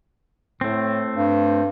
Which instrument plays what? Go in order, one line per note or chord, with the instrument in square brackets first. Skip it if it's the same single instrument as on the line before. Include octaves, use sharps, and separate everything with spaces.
[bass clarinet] A2 [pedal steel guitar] A3 C4
[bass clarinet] G2